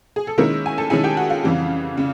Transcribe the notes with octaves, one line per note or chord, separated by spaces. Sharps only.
G#4
A4
D#3 G#3 A#3 C#4 E4 A#4
G#5
A4 A5
D#3 G#3 C#4 E4 G#4 G#5
G4 G5
F#4 F#5
F4 F5
F2 C#3 E3 G3
C#3